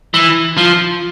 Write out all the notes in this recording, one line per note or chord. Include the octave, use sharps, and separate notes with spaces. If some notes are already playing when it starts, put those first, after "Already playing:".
E3
F3